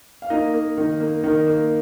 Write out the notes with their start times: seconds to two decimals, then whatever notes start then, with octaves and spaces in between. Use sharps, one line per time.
0.22 F5
0.30 A#3 D#4 D#5
0.54 A#3
0.77 D#3
1.00 A#3
1.24 D#3
1.46 A#3